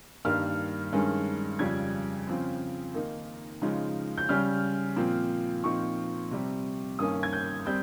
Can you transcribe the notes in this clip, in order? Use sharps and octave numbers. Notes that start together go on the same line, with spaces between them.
G2 D#3 G3 A#3 F6
G2 D#3 G#3 C#4
F2 C#3 G3 G#6
C#3 F3 C4
D#3 A#3 D#4
C#3 F3 G#3 D#4
G6
C#3 G3 C#4 F6
A#2 F3 C4
A#2 F3 C4 D#4 C#6
C3 G3 C4
G2 D#3 A#3 C#4 D#6
G#6
G6
G3 C4 G6